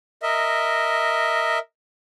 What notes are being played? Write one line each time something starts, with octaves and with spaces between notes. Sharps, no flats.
A#4 D#5 E5